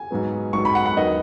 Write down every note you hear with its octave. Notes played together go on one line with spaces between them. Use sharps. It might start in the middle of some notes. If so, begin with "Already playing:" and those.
Already playing: G#5
G#2 F#3 B3
G#2 F#3 B3 C#6
B5
F#5
F#5
D#2 D#3 F#3 B3 D#5